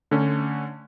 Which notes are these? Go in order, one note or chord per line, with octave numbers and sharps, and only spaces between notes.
D3 A3 C#4